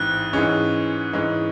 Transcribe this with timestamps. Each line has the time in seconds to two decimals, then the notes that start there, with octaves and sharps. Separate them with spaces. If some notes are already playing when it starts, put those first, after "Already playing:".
Already playing: A1 G#2 E3 C4 F#6
0.33 G#2 E3 G#3 C#4
1.13 G#2 E3 G#3 C#4